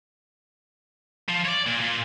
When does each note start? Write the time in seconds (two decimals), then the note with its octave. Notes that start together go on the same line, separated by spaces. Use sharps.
1.29 F3
1.46 C#5 D5
1.67 A#2
1.80 A#2